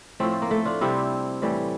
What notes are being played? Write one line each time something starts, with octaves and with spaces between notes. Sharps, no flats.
A2 F3 A3 C4
A#3
A3
D4 F4
C3 G3 C4 E4
A2 E3 G3